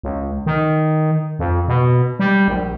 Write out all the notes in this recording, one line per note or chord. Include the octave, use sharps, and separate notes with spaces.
C#2
D#3
F2
B2
G3
A#1